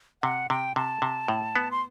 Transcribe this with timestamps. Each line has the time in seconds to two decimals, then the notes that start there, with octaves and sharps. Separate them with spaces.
0.23 C3 F#5
0.50 C3 G5
0.76 C3 A5
1.02 C3
1.28 A2
1.56 B3
1.71 C6